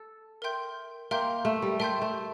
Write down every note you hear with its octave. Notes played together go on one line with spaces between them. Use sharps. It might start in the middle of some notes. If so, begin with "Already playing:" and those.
Already playing: A4
A#4 E5 G5 C6 G6
A#3 A#4 E5 G5 C6 G6
A3
G3
A3 A#4 E5 G5 C6 G6
A3